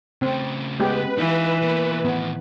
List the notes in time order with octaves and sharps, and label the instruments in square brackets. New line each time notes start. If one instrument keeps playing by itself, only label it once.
[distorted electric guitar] C#3 A3 [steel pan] C4
[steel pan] G#3 B3 G4 [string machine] B4
[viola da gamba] E3 [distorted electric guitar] D#4 F4
[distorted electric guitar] B2 A#3
[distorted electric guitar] A2 D#3 [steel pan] B3